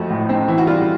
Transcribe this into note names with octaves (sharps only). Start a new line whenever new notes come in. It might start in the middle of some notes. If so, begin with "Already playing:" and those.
Already playing: F2 F3 A3 F#4
A2
C4 D#4
E3 E4
F#4
G3 F4